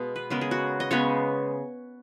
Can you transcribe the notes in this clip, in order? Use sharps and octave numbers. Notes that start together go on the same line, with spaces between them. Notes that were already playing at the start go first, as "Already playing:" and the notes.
Already playing: B2 G#3 B3 F5
B4
C#3 G#3 B3 A#4
G#4
F#4
D#5
C#3 G#3 B3 C#5